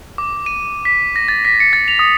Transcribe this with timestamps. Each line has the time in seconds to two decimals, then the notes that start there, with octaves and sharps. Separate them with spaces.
0.18 D6
0.46 D#7
0.85 B6
1.16 A#6
1.28 A6
1.45 B6
1.60 C#7
1.73 A6
1.88 F7
1.99 D#6